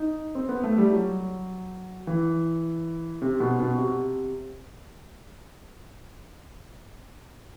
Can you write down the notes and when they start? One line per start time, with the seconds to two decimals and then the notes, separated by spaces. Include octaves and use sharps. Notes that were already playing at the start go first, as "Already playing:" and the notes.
Already playing: D#4
0.35 C4
0.49 B3
0.63 A3
0.78 G3
0.92 F#3
2.07 E3
3.22 C3
3.40 B2
3.60 B2
3.78 C3